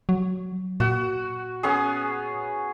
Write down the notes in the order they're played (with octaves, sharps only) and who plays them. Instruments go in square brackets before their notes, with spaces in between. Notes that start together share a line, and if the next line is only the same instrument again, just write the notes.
[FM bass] F#3
[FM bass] A#2 [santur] F#4
[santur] B3 C#4 G#4